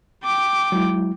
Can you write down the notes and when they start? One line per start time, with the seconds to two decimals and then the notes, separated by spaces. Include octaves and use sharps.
0.24 G5 D6
0.72 F#3 G#3 E4